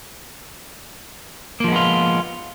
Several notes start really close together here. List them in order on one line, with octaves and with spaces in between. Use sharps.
A#3 F3 G#3 B3 F4